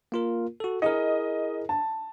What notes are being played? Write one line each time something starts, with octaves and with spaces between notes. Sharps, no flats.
A#3 F4 A#4
F#4 A4
E4 G#4 A#4 D#5
A5